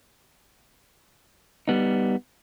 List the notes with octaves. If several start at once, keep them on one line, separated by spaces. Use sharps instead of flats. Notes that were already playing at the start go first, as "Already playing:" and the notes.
G3 B3 D#4